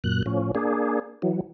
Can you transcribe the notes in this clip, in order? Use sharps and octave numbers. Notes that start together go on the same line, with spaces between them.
F#2 A#2 F#6
A2 F3 C#4
A#3 D4 G#4
E3 F#3